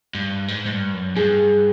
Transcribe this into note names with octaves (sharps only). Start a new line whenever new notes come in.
G2
G#2
G#2
G2
F#2
G2 G#4